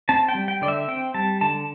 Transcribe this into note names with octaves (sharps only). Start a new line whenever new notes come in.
C4 A5
G5
G3
G5
D3 D5
E5
C4 G5
G3 A5
D3 A5